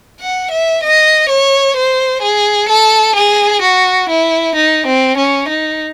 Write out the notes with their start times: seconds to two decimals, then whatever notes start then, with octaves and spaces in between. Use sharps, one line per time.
0.21 F#5
0.51 E5
0.83 D#5
1.29 C#5
1.76 C5
2.22 G#4
2.69 A4
3.16 G#4
3.62 F#4
4.10 E4
4.56 D#4
4.87 C4
5.18 C#4
5.49 D#4